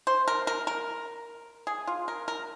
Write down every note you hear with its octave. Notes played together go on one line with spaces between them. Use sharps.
C5
A#4
A#4
A#4
G#4
F4
A#4
A#4